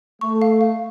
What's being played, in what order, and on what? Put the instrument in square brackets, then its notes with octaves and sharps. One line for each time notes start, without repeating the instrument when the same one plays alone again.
[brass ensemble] A3 [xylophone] C#6
[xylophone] F5
F5